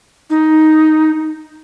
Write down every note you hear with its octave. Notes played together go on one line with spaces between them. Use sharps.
D#4